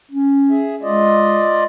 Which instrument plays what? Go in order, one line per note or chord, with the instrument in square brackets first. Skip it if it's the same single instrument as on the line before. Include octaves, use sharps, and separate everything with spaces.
[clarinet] C#4
[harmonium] G#4 E5
[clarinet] G#3 [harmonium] F4 D5 D#5